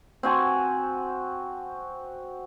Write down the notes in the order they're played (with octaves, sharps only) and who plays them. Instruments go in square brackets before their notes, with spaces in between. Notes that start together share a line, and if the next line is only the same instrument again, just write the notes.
[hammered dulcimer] C4 F#4 G#5 A5